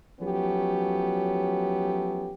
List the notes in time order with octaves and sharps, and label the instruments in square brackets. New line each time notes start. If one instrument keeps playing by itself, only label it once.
[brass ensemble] F3 F#3 A3 B3 C#4 G4